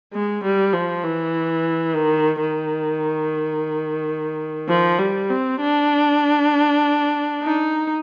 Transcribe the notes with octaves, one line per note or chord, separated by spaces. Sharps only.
G#3
G3
F3
E3
D#3
D#3
F3
G3
C4
D4
D#4